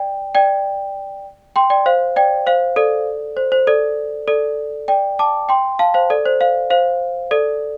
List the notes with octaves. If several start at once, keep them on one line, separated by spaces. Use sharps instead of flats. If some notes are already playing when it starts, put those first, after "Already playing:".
Already playing: D5 G5
D5 G5
G5 C6
D5 G5
C5 F5
D5 G5
C5 F5
A4 D5
C5
C5
A4 D5
A4 D5
D5 G5
A5 D6
G5 C6
F5 A5
C5 F5
A4 D5
C5
C5 F5
C5 F5
A4 D5